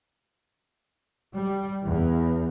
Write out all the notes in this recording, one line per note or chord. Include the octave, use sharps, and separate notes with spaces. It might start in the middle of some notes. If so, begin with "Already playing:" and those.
G3
E2